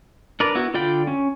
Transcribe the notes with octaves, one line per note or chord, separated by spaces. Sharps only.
D4 A#4 B4 D5
B3 E4 F#4
D3 F4 D5 G5 B5
C#4